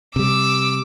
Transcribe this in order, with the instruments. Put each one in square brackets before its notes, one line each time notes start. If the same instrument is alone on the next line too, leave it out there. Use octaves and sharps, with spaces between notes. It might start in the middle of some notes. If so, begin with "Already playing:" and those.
[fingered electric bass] C3 G3 [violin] D6 E6